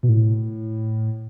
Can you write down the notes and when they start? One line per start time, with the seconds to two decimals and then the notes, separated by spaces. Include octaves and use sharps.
0.03 B2
0.09 A2